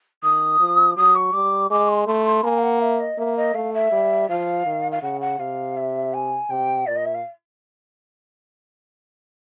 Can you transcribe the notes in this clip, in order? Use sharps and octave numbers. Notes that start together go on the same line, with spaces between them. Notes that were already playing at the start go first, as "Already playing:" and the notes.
D#3 D#6
F3
F#3 D#6
C#6
G3 D6
G#3 D6
C6
A3 C6
C6
A#3 G#5
F5
F#5
E5
D#5
A#3 E5
D#5
A3 F5
E5
G3
F3 F5
D#3
F5
C#3 F#5
F#5
C3 F5
E5
G#5
C3 G5
A#2 D5
D#5
E5
F5